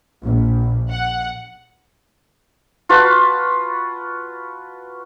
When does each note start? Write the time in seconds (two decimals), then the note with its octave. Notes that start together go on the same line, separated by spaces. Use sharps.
0.23 A#1
0.89 F#5
2.89 F4 F#4 B4 A5